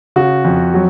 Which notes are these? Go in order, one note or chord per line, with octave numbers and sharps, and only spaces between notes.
C#3 F#4
F2
F#3